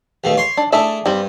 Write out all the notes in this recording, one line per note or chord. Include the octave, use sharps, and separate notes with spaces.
D#2 B2 A3
C#5 C6
D4
A3 D4 E4 G#4 E5
G2 G3 C4